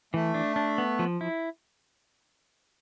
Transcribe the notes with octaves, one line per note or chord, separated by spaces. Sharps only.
E3 A3
D4
D4
B3
F3
E4